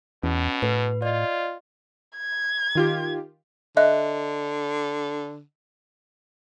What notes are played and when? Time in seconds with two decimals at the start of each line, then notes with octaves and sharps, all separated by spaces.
0.23 E2 B2 C#4
0.62 A2 B4
1.02 F4 D5 D#5
2.17 G#6
2.75 D#3 F4 G4
3.77 D3 D#5 E5 F#6